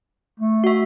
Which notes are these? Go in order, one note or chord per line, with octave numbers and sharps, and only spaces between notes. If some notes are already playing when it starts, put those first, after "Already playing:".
A3
F#4 E5